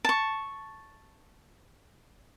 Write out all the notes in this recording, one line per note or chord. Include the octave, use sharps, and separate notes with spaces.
A5 C#6